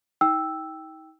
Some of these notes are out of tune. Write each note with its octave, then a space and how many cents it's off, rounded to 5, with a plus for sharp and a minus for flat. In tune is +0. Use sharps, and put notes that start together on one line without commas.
D#4 +40 G5 +0 E6 +0